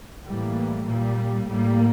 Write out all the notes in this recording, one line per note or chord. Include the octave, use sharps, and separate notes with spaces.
A2 E3 G3 A#3
A#2 G3 A#3
A2 G3 A#3